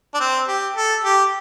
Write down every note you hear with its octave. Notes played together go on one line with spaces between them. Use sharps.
D4
C4
G4
A4
G4